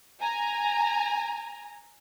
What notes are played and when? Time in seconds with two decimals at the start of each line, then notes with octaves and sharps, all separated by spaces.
0.21 G#5 A#5